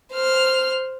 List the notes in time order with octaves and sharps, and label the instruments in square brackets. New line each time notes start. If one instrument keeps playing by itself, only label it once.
[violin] C5 F6